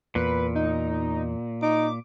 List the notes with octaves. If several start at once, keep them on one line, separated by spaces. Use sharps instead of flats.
E2 A#2 B4
D#4
D#4 D6